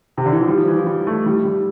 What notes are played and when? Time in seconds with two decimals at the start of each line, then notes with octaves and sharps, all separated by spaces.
0.17 C3
0.26 D3
0.32 E3
0.41 F3
0.48 G3
0.58 F3
0.68 E3
0.78 F3
0.86 G3
1.07 A3
1.26 G3
1.45 G3